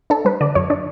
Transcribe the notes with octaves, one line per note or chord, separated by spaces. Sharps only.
D4 A4
G3 B4
D3 D5
F#2 C#5
D4 D5